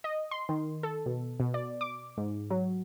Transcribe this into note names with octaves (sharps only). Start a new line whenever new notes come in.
D#5
C6
D#3
A4
B2
B2
D5
D6
G#2
F#3